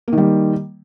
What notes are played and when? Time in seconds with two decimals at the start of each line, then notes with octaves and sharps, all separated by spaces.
0.08 A#3
0.13 D#3
0.18 G3